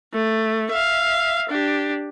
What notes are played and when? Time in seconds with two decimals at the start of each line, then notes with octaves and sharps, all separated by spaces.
0.14 A3
0.72 E5 F5
1.49 D4 G4